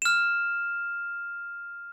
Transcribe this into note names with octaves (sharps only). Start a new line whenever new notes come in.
F6 E7